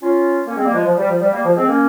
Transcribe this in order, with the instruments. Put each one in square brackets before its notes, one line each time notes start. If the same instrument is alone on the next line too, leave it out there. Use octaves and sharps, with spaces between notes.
[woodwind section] C#4 F4
A#3 C#4
G#3 C4
G3 A#3
F3 G#3
F3
G3
F3
G3
G3 A#3
F3
G#3 C4
A#3 C#4